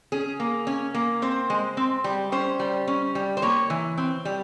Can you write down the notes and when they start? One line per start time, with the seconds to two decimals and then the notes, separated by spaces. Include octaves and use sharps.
0.12 C#4 G#4
0.40 A#3
0.67 C#4
0.94 A#3
1.22 C4 C5
1.50 G#3
1.77 C4
2.04 G3
2.32 C#4 C5
2.60 G3
2.87 C#4
3.15 G3
3.37 C5
3.42 A#3 C#5
3.70 E3
3.98 C4
4.25 G3